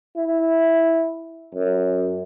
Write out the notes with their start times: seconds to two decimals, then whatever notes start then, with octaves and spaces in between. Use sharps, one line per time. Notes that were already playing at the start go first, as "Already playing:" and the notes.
0.16 E4
1.55 F#2